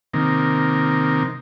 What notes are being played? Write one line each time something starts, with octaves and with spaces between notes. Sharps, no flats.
C3 D#3 A#3